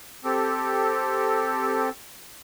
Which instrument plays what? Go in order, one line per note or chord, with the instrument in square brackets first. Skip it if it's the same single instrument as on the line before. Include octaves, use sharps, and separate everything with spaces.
[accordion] C4 G4 A4